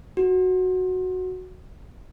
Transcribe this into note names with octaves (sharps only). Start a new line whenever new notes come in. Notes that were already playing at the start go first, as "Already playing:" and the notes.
F#4